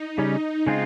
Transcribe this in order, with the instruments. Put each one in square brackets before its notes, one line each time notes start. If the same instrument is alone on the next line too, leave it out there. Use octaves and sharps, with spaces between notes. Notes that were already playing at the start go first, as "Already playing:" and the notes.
Already playing: [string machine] D#4
[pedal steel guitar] C#3 G3 C#4 [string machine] D#4
[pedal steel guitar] C#3 G#3 C4 F4